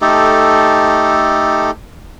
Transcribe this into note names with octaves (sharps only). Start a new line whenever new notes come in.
A3 D#4 G4 A4